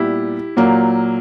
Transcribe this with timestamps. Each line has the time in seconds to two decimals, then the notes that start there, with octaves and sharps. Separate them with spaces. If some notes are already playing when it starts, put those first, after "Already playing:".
Already playing: A#2 G3 B3 E4 G4
0.57 A#2 F#3 A#3